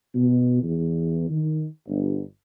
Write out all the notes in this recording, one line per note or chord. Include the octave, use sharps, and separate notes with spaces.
B2
E2
D#3
G1